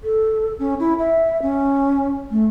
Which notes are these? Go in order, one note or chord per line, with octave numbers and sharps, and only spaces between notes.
A4
C#4
E4
E5
C#4
A3